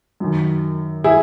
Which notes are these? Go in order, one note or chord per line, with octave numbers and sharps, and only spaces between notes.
F#2 D#3
E4 G#4